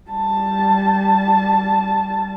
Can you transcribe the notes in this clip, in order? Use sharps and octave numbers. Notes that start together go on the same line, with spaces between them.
G3 A5